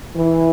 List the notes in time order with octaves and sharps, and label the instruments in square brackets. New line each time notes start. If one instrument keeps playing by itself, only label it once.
[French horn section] E3